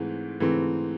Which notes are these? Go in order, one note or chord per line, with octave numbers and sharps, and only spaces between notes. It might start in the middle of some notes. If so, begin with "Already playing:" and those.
Already playing: G#2 E3 A3 C4
G#2 E3 A3 C4